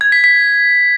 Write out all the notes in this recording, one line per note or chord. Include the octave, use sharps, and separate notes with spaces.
G#6
B6
B6